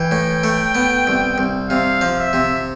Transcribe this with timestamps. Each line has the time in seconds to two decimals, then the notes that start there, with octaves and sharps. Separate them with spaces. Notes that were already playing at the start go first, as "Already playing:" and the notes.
Already playing: E3 G5
0.11 A2
0.44 A3
0.75 B3
1.07 C2
1.38 C2
1.69 C3 F5
2.01 F3
2.17 E5
2.33 C3